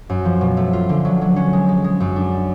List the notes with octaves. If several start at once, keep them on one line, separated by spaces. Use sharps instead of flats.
F#2
F3
B2
A3
F4
D3
F#3
F#3
C#4
G#3
G#3
G#3
F#2
D4